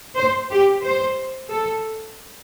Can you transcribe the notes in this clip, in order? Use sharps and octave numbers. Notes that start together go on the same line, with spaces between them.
C5
G4
C5
A4